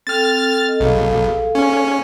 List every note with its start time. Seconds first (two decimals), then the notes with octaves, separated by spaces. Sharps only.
0.07 C4 A4 G5 F6 A6
0.65 A4 D#5
0.80 B1 G#4 A4 F5
1.55 C#4